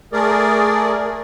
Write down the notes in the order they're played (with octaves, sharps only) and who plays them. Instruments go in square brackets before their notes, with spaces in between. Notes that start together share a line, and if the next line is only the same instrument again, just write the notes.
[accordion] A3 G#4 A#4 D5